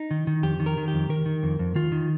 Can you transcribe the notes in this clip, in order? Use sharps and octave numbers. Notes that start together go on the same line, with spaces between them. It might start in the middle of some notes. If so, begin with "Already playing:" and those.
Already playing: D#4
D#3
D#3
F2 G4
D#3
A#4
D#3
G4
F2
D#3 A#4
D#3
F2
F2
D#3 F4
D#3